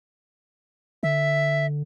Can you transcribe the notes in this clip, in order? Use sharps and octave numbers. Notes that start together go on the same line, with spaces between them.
D3 E5